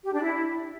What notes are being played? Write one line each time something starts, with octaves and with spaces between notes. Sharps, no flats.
G4
D4
E4